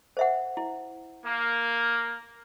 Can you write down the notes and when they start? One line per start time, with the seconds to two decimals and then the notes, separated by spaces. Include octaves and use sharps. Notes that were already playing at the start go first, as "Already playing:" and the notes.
0.17 C5 E5 F#5
0.57 E4
1.25 A#3